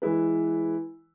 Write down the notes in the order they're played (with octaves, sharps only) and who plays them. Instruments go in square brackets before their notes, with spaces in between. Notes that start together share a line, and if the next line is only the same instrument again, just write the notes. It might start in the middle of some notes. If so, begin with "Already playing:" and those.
[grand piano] E3 G#3 E4 B4